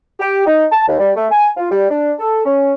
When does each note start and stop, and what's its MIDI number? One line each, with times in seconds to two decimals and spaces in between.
0.20 0.42 67
0.46 0.65 63
0.71 0.88 81
0.88 0.97 39
0.99 1.11 55
1.16 1.26 57
1.31 1.49 80
1.57 1.70 65
1.70 1.86 55
1.90 2.12 62
2.19 2.44 69
2.45 2.73 61